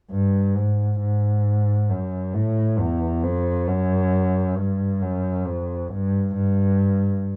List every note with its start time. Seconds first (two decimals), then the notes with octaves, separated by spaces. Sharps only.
0.11 G2
0.55 G#2
1.00 G#2
1.90 F#2
2.34 A2
2.79 E2
3.23 F2
3.68 F#2
4.58 G2
5.02 F#2
5.46 F2
5.91 G2
6.36 G2